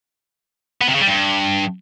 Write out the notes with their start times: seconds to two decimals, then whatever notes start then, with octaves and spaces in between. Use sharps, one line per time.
0.81 B3
0.88 C3
0.95 C#3
1.01 G3
1.08 G2